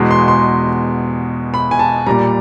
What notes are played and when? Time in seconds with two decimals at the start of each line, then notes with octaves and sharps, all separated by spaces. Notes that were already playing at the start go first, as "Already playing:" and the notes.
Already playing: E2 B2 G#3
0.11 C6
0.28 C6
1.54 B5
1.71 G#5
1.79 A5
2.07 A#2 G3 A#5